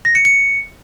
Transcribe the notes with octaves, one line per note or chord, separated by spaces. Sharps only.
A#6
C#7
C#7